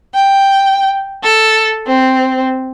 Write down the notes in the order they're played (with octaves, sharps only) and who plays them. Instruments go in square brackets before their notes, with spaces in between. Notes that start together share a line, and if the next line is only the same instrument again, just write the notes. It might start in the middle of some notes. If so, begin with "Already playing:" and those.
[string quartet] G5
A4
C4